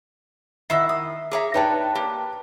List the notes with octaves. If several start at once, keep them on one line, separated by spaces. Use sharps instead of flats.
D#3 E4 D#5 E5 F#5 C7
D#6
G#4 C#5 E5 A#5 D6
D#4 B4 C#5 D5 G5 A5
A#3 G4